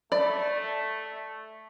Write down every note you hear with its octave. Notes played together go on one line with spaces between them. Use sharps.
A3 D5 B5